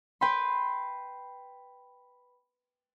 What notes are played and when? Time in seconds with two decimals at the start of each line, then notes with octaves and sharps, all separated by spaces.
0.21 B4 G5 B5 C6